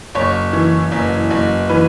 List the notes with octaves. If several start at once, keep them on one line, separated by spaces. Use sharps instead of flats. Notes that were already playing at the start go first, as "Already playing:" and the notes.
F#1 C#5
E3
F#1
F#1
E3 B4